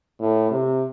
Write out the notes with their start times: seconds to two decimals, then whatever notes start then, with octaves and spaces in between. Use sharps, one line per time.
0.20 A2
0.51 C3